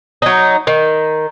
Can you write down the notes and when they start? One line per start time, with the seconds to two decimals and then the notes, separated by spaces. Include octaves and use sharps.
0.22 F#3 D#4
0.67 D#3